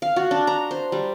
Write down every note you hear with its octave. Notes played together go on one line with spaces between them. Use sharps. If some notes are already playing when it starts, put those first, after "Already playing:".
F5
F#4
D4
A#5
C5
G3